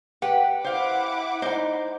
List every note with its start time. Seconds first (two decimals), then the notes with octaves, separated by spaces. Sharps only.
0.22 G4 B4 F#5
0.64 E4 C5 F5 F#5 D6
1.42 D#4 C5 G#5